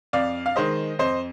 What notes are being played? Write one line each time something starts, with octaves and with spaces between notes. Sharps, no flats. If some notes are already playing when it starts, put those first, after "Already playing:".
F2 D5 F5
F5
D#3 G#3 C5 D#5
F2 C5 D#5